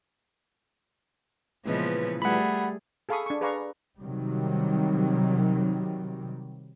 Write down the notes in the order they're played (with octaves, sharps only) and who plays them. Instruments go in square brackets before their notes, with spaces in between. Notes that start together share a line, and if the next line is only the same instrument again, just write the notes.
[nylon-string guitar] A#2 E3 G#3 [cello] C#3 [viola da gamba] F3 B3 B4
[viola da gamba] G3 G#4 [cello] A3 [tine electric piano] F#5 B5
[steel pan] G#4 A4 F5 B5 C#6 D#6
D4 C#6
G#4 B4 D5 F5 A#5 C#6
[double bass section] C3 D#3 F#3 G3